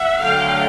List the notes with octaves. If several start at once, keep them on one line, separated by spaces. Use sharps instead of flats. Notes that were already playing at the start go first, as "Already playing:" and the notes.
Already playing: E5 F#5
D3 F#3 A3 F5 G5